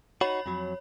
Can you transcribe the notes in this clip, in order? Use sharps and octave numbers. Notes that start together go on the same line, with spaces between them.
D#4 F#4 C#5 B5
F2 F#3